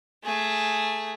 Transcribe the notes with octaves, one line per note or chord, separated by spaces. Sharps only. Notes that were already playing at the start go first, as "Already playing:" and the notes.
A3 G#4